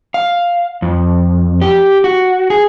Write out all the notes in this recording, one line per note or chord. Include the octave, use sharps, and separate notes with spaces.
F5
F2
G4
F#4
G#4